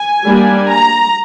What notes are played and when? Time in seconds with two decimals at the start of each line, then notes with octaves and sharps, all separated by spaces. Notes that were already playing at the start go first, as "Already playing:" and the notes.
Already playing: G#5
0.25 G3 A#3 D4
0.69 A#5